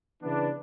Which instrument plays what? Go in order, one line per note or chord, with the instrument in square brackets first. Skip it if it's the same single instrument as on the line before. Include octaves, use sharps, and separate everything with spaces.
[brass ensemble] C#3 E3 B3 D4